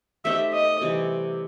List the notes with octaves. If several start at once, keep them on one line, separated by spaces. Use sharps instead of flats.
A3 C4 D#4 G4 E5
D#5
C3 E3 G3